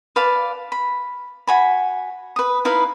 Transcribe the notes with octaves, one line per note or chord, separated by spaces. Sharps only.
B4 D5 F5 A5
B5
F#4 G#5 B5
B4 D#6
D#4 E4 B4 F5